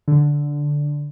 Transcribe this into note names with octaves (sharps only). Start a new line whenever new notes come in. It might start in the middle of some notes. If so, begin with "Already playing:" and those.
D3